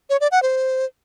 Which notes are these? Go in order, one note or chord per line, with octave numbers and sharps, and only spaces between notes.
C#5
D5
F#5
C5